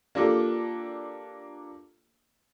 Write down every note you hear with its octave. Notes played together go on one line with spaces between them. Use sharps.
A#3 D4 F4 G4 A4